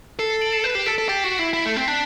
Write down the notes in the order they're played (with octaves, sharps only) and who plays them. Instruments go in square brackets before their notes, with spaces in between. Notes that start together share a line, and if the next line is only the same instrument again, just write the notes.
[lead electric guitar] A4 [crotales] C7
[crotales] C7
D7 F#7
C7 E7
[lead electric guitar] B4 [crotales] C7 E7
[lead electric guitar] G4 [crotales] C7 E7
[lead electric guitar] A4 [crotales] B6 D7
[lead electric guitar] A4
[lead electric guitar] G4 [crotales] A6
[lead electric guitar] F#4 [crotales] B6
[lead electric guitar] E4 [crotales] C7
[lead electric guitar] E4 [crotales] B6
[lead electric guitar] A3
C4
D4